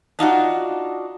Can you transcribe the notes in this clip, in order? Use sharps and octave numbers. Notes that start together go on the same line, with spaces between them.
D4 D#4 F4 F#4